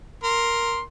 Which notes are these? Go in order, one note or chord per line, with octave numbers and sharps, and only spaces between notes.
A#4 C6